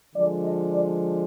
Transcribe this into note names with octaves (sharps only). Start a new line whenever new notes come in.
D3 F3 G#3 D5
D#5
D5